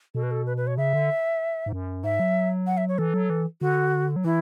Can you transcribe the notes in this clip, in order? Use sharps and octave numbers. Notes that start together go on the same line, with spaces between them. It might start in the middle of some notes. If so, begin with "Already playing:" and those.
B2 A4
B4
A4
B4
B4
C#5
C#3 E5
D3
G#2
F#2
G#2 E5
F#3
F#5
E5
C#5
E3 A4
F#3
E3
D3 F#4
F#3
E3 E4